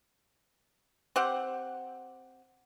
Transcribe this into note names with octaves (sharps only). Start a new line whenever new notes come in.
C4 G4 F#5